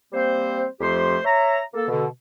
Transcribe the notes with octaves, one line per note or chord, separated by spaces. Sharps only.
G3 A#3 C4 C5
F2 F3 A3 G4 C5 C6
C#5 E5 A#5
A#3 A4
B2 D3